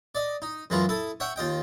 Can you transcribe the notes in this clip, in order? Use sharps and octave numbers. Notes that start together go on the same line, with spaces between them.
D5 D#5
D#4
F#2 E3 G#3 F4 B4
E4 A4 D#6
C#5 E5 F#5 G5
D#2 F4 D#5 G5